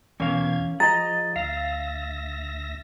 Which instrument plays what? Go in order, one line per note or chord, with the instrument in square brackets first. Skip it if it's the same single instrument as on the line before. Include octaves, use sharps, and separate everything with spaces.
[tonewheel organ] E2 B2 G#6 [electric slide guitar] E3 A#4 F5 [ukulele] C#4
[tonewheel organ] F3 [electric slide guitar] G#4 D#5 [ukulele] A#5 [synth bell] A6
[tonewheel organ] D2 E5 A#6 [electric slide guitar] F5